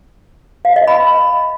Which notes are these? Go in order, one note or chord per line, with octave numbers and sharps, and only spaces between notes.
F5
D#5
B5